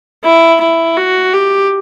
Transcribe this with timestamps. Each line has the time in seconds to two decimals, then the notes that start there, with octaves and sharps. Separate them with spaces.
0.24 E4
0.61 E4
0.97 F#4
1.33 G4